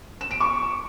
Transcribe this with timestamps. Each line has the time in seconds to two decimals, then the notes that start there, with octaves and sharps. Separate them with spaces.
0.21 E7
0.31 D7
0.40 C#6